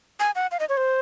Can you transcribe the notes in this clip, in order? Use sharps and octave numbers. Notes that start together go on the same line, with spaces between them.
G#5
F#5
F5
D#5
C#5
C5